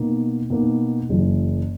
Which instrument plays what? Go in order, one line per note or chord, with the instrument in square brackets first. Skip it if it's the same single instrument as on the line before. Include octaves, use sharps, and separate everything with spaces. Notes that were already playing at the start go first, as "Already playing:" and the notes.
Already playing: [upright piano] B2 A#3 D#4
B2 A#3 D#4
F#1 F#2 E3